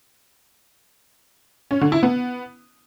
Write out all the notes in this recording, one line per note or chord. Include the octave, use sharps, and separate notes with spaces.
C#4
D3
E4
B3